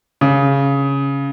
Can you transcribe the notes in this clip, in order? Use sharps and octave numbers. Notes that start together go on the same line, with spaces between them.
C#3